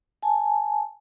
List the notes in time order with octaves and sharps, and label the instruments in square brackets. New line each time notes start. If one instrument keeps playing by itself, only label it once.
[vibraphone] G#5 A5